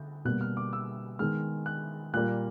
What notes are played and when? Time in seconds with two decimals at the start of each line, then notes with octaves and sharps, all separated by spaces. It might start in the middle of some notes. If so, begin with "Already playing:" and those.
Already playing: D3 G6
0.25 B2 G3 A#3 F#6
0.41 F6
0.57 D6
0.73 E6
1.19 D#3 G#3 B3 F6
1.66 F#6
2.13 A#2 G3 A#3 F#6